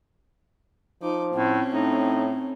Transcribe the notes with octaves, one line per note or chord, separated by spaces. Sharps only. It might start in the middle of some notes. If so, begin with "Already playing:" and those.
F3 D#4 D6
A2 C4 C#4
A2 D#4